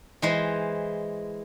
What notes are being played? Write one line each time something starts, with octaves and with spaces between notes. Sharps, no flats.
E3 G#3 C5